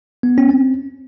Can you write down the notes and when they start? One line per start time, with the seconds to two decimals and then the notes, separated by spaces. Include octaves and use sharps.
0.23 B3
0.38 C#4
0.49 C4